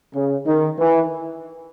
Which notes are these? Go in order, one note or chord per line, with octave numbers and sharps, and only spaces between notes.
C#3
D#3
E3